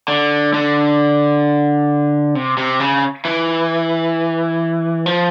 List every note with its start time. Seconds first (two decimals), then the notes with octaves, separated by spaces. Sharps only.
0.08 D3
0.54 D3
2.35 C3
2.57 C3
2.80 C#3
3.25 E3
5.06 F3